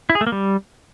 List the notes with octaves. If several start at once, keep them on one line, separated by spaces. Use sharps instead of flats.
E4
G#4
A3
A#3
G3